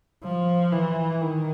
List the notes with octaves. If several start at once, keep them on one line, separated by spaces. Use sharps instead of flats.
F3
E3
D#3